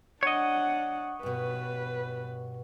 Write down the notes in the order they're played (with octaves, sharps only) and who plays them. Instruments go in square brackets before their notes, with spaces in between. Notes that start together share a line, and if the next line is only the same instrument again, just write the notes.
[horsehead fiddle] D4 F#5 [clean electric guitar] C#5 D#5
[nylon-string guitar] G2 B2 [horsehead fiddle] B4